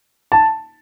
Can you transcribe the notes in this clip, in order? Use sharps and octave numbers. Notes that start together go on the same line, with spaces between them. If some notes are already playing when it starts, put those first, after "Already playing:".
A5